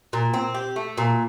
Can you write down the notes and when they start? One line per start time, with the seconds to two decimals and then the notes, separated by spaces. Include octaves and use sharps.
0.13 A#2
0.34 C4
0.54 G4
0.76 A3
0.98 A#2